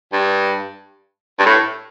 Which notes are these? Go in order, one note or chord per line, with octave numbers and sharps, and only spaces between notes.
G2
G2
A2